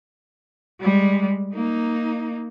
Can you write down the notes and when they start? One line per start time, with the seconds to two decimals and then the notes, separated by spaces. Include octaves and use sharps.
0.80 G3 G#3
1.54 A#3 D#4